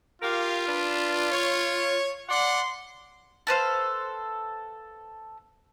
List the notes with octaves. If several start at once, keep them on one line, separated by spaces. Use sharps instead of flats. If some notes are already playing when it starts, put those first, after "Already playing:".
F4 G4 A#4 F5
D4 B4
C#5
D5 F#5 C6
A4 B4 C5 F5